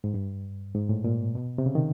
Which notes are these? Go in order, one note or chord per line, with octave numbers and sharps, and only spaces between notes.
G#2
G2
G#2
A2
A#2
B2
C3
C#3
D#3